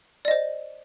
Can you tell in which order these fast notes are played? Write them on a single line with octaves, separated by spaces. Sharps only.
D5 D#5 C5